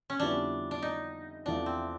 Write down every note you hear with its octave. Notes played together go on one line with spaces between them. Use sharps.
C#4
F2 D3 G3 B3 D4 E4
D4
D#4
E2 C3 F3 A3 D4
C4